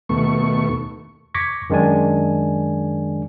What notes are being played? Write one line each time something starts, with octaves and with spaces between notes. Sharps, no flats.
D#2 B2 A3 C#6
C#6 D6 G#6 A#6 B6 C#7
F#2 D#3 G#3 D4 D5 G#5